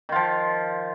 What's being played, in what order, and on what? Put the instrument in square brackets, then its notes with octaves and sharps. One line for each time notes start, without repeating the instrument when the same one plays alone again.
[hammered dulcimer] D#3
F4
F3